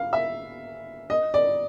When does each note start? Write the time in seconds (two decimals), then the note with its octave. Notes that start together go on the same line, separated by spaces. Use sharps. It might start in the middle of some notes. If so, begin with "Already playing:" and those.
Already playing: F5
0.13 E5
1.10 D#5
1.34 D5